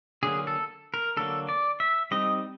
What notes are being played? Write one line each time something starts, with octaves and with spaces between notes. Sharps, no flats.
D3 F#3 A#3 G#4
A4
A#4
D3 F#3 A#3 A4
D5
E5
G3 C4 D#4 D#5